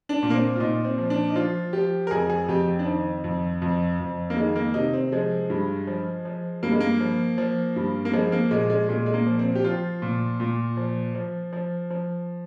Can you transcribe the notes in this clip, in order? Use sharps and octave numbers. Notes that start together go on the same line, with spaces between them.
D4
A#2
A#3
C4
F4
A#2 D#4
C4
F3
D4
D#4
F3 F4
F3 G4
A#4
F2 G#4
G#4
F2 G4
D4
D#3 C4
F2
F2
F2
A#3
D#3 G#3
A#3
C3 D#4
C4
F3 G#3
G2
F3
F3
G2 A#3
G#3
A#3
F3
F3
G2
A#3
F3 G#3
A#3
A#2 G#3
G#3
A#2 G#3
G#3
A#3
F3
C4
G4
F3 F4
A#2
A#2
F3
F3
F3
F3